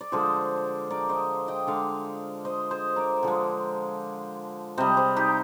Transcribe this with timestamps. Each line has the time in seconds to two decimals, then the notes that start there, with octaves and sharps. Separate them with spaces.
0.01 D5
0.12 D3 F3 G#3 G#4 C5
0.90 A#4 D5
1.09 C5 D#5
1.48 D#5 G5
1.67 D3 G#3 D5 F5
2.45 C5 D#5
2.71 G#4 C5
2.96 A#4 D5
3.23 D3 F3 G#3
4.77 C3 G3 C5 D#5
4.97 G#4 C5
5.16 D#4 G4